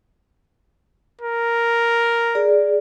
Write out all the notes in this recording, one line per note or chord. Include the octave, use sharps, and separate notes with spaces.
A#4
G#4 D5